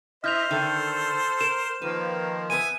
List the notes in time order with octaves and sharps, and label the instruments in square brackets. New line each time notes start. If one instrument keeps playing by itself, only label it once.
[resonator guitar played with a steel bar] E4 [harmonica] C5 [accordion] D#5 E5 [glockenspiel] F6 G6 F7
[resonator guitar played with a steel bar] D3 D#3 [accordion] A4
[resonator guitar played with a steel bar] A#4 [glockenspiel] E7
[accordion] D#3 F3 [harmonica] A#3 [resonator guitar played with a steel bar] B4
[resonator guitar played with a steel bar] B3 B4 [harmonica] E5 G#5 [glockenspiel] D#7